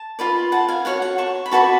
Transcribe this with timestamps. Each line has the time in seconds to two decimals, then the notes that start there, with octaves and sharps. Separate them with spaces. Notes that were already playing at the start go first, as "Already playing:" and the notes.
Already playing: A5
0.19 F4 B4 D5
0.52 F#5 A5
0.68 F5 G#5
0.85 F#4 C#5 F#5
1.02 F#5
1.18 A5 C#6
1.46 B5
1.51 F#4 B4 D5 A5 C#6